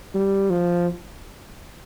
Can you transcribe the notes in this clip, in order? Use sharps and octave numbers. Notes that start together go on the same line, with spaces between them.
G3
F3